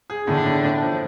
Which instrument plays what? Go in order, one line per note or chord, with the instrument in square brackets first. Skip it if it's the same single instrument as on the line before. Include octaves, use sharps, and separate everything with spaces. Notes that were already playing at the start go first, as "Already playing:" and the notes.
[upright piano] G#4
[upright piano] A2 [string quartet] D3 D4
[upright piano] A2
A2
F3